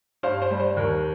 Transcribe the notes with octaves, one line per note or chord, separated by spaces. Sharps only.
G2 C5 F5
C5
G3
C5
D#2 A#4